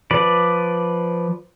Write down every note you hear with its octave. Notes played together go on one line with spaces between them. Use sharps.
F3 B4 D5